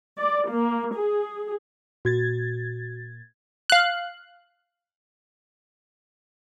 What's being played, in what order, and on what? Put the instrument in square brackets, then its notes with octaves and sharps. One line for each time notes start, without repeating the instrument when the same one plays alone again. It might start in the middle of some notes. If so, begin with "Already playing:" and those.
[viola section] D5
A#3
G#4
[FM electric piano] A#2 G#6 A6 [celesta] F#4
[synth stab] F5 F#6